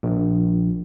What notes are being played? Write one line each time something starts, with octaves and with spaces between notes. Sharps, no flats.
A#1